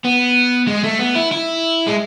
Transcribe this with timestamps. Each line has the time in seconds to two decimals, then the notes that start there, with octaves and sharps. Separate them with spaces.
0.05 B3
0.68 G#3
0.84 A3
0.99 B3
1.16 E4
1.32 E4
1.86 G#3